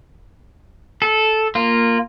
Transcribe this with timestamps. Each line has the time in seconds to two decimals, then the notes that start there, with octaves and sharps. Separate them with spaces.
1.02 A4
1.55 A#3 F4